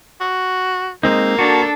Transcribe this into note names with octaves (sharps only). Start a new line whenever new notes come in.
F#4
G#3 A#3 C4 D#4
D4 F#4 A4